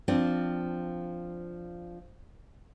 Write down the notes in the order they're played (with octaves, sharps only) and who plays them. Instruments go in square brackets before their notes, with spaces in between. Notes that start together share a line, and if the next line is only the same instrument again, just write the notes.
[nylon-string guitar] F3 C4 D4